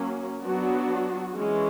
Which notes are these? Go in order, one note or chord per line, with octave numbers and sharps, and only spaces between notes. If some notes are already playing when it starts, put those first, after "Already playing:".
Already playing: F#3 A#3 C#4
F#3 B3 D4 F#4
E3 G#3 C#4